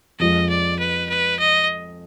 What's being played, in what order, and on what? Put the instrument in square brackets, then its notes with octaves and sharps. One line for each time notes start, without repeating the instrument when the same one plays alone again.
[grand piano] F2 F3 G#3 [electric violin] D#5
[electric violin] D5
B4
B4
D#5